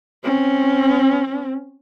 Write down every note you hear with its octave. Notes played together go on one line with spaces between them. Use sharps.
C4 C#4